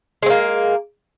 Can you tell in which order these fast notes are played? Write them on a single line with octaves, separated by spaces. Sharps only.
G#3 C4 A#3